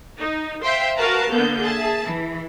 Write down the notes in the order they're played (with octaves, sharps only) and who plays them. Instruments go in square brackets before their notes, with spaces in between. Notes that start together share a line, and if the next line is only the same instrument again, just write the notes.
[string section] D#4
C5 E5 F5 G5 C6
F#4 A#4 B4 F5 A5 A#5
D3 A#3 B3 G6
G#4 E5 A5
E3